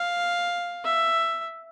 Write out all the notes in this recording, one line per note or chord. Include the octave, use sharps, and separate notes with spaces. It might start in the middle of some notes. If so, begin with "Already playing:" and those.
Already playing: F5
E5